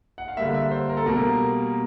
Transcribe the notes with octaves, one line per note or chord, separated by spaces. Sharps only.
F#5
F5
D3 G3 A#3 E5
E5
C5
A#4
A4
B2 G3 A#3 A#4